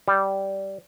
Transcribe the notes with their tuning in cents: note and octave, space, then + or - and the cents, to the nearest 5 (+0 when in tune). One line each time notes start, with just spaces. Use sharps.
G3 -10